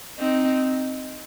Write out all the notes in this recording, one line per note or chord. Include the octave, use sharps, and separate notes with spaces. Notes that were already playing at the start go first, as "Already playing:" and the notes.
C4 D#4